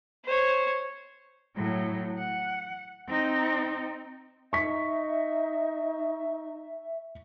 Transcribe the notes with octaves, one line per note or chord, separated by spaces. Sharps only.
C5 C#5
A2 F#3
F#5
C4 D#4
D#4 E5 C#6 B6